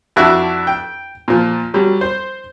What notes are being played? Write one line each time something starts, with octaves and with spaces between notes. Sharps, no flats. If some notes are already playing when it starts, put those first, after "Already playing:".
F2 D4 E4 F#4 F#6
G5
A#2 F3
F#3 G3
C5